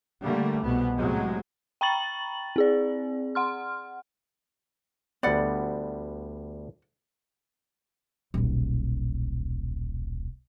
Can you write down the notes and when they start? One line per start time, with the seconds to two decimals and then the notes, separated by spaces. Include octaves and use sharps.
0.22 D3 G3 A3 A#3
0.61 C2 B2 B3
0.95 A2 C3 F#3 G#3
1.81 G5 A#5 B5 C#6 A6 F#7
2.56 C4 G#4 D5
3.35 F#5 C6 F6
5.23 D2 G3 B3 D5 F#5
8.34 D#1 B1